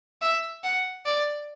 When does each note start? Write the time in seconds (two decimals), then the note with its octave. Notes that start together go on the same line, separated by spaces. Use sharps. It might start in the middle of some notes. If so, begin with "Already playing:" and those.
0.22 E5
0.64 F#5
1.06 D5